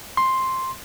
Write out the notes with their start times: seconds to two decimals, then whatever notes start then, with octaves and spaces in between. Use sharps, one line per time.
0.17 C6